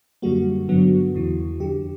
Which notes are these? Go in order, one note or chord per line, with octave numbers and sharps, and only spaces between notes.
F#2 D3 G3 A#3 F#4
G2 D3 F#3 B3
E2 C#3 E3
F2 D3 F3 G4